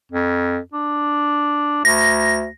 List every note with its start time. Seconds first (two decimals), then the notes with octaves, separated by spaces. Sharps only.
0.12 F2
0.74 D4
1.85 D2 A#6